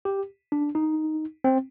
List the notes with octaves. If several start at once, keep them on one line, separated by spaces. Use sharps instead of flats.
G4
D4
D#4
C4